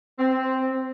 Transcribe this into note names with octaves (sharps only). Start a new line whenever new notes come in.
C4